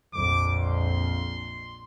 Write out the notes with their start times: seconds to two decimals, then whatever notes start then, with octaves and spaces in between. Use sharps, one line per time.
0.14 A#1 F2 D6
0.61 C6